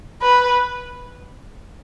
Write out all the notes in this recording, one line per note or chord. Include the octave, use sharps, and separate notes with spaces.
B4